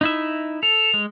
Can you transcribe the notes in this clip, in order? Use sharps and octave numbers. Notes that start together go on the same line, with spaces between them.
D#4 E4 E5
A4 F7
G#3